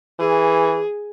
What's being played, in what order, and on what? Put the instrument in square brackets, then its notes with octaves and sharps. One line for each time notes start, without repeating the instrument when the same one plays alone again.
[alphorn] E3 [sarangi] G#4